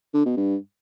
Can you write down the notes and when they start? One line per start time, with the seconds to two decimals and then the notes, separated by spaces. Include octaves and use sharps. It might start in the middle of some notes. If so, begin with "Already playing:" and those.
0.14 D3
0.25 B2
0.37 G2